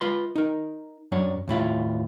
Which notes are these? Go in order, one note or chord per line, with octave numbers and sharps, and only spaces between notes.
F4 B4 C6
D#4 A#4
F#2 F#3 D4 C#5
D#2 A2 E4 F4